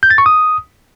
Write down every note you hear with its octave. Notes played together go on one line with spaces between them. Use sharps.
G6
A6
C#6
D#6